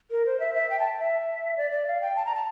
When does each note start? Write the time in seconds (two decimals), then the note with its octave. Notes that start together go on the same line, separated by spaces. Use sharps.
0.11 A#4
0.26 C5
0.40 E5
0.54 E5
0.70 G5
0.79 A5
0.99 E5
1.57 D5
1.71 D5
1.87 F5
2.01 G5
2.16 A5
2.26 A#5
2.35 A5